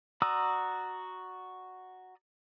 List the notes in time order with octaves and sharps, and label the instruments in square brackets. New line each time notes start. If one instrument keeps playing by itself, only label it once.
[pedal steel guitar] F#4 D5 A#5 D#6 E6